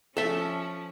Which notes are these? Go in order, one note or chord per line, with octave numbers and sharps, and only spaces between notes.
F3 C#4 A4 E5